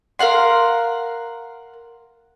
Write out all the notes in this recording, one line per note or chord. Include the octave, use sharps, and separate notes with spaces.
A#4 F5 F#5 C6